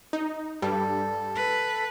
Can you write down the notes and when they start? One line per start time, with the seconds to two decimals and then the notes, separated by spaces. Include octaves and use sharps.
0.13 D#4
0.62 G2 G3 A4
1.35 B4